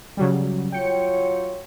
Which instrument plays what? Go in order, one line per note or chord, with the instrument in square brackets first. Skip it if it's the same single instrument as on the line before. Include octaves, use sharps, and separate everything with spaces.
[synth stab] C#3 F#3 G3
[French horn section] F#3 F4 C#5 [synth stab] G5 C#7